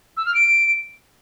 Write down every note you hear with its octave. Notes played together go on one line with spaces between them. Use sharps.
E6
F6
D7